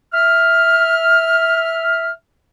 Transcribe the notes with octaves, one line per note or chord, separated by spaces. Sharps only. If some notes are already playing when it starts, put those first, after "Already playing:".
E5 F6